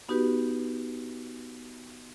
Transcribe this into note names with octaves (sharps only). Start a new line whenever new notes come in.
B3 D#4 F#4 G4 B4